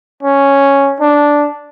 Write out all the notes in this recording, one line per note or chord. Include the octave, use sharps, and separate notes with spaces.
C#4
D4